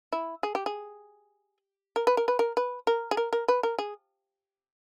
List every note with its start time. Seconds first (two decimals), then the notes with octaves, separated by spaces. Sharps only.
0.13 E4
0.43 G#4
0.55 G4
0.66 G#4
1.96 A#4
2.07 B4
2.17 A#4
2.28 B4
2.39 A#4
2.57 B4
2.87 A#4
3.11 G#4
3.17 A#4
3.33 A#4
3.48 B4
3.63 A#4
3.79 G#4